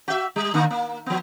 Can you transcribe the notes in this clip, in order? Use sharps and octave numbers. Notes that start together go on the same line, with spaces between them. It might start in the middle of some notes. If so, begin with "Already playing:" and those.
F#4 E5
G3
D3 A#3
A#3
F3 B3